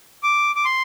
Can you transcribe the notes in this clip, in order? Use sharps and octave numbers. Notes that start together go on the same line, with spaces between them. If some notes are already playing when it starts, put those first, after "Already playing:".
D6
D6
C6